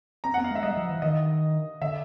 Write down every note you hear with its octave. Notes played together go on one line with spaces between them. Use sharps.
C4 A#5
B3 F#5
F5
G#3
E5
G3 D#5
F3
E3
D#3 D#5
D3 E5